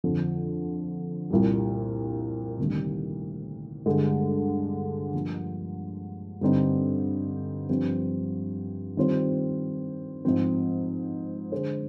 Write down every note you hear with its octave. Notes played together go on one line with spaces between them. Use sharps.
F2 D3 F3
C2 A#2 G3
D2 C3 D#3 G3 A#3
G2 D3 G#3
G2 F3 A#3
G2 D3 G3 C4 D#4
G2 F3 C4
D#3 G3 C4 F4 C5
G#2 F3 C4
D3 G#3 D4 G#4 C5